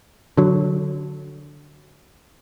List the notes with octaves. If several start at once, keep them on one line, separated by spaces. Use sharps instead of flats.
D3 F#3